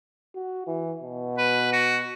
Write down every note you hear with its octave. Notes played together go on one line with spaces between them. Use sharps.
F#4
E3
B2
B4
F#4